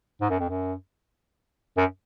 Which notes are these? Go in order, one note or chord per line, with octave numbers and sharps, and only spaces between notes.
G#2
F#2
F2
F#2
F#2